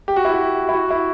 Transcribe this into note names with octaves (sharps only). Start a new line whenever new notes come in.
G4
F#4
E4
F#4
E4
F#4
E4